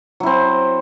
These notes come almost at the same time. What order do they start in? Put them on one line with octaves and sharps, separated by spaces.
F#3 E4 C4